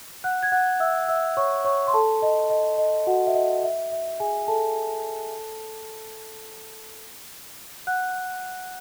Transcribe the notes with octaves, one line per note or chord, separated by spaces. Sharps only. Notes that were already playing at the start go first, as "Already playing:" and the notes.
F#5 F#6
G#6
F#5 F#6
E5 E6
E5 E6
C#5 C#6
C#5 C#6
C6
A4 A5
D#5
D#5
D#5
F#4 F#5
E5
D#5
E5
E5
G#4 G#5
A4 A5
F#5 F#6